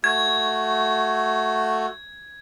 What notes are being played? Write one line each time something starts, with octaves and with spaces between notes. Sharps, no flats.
A3 F#4 G#6